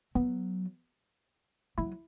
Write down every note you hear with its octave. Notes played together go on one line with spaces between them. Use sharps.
F#3 B3
F#3 E4